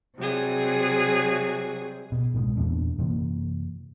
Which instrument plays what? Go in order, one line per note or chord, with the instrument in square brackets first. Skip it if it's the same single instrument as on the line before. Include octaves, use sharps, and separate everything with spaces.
[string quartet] C3 F#3 G3 G#4
[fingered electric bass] B2
C2 G#2 B2 G#3
E2 A#2 B3 D4
F#2 C3 E3 A#3